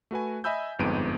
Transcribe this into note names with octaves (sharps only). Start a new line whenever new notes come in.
A3 F#4 B4 G#5
D#5 E5 G#5 B5 E6 G6
G1 F2 G#2 B3 D7 D#7